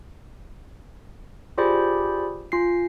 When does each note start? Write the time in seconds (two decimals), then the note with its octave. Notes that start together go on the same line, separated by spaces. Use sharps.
1.58 F4 G4 G#4 C5 D5 B5
2.52 F4 G#5 C7